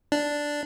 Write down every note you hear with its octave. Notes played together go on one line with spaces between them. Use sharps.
D4